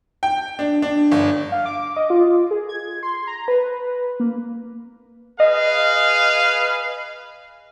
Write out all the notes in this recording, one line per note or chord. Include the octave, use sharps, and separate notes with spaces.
G5
D4
D4
G1
F5
D6
D#5
F4
G#4
G#6
C6
A#5
B4
A#3
G#4 B4 D#5 F5